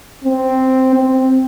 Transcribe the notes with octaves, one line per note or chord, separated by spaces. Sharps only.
C4
C4